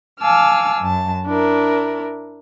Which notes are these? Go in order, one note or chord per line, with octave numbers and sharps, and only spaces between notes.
F5 G#5 A5 D6 E6 F6
F#2 A5
D4 E4 A#4